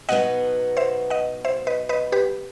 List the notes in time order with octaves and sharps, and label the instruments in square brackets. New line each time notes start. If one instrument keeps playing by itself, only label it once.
[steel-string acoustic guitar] B2 F#3 B3 D#4 [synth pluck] D#5 F#5
[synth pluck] C5 E5
D#5 F#5
C5 E5
B4 D#5
B4 D#5
G4 B4